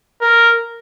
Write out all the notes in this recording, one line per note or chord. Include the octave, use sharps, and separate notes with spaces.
A#4